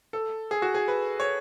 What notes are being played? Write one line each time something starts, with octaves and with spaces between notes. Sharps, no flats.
A4
G#4
F#4
G#4
B4
C#5